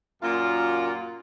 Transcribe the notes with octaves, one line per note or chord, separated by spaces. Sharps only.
F#2 A#2 F4